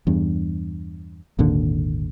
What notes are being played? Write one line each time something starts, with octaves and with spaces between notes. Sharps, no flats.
E2 G2
G#1 D#2 A#2 D3